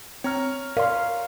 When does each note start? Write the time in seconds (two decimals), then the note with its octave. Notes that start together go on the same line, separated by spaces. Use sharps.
0.24 C4 C#5 A#5 F6
0.77 A#4 D5 F5 C6